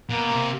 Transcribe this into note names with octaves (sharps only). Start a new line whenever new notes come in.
B2 A#3
C3